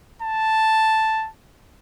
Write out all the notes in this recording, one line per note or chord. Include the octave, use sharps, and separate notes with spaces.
A5